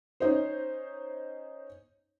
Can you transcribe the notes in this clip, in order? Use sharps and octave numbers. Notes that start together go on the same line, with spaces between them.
C#4 D#4 C5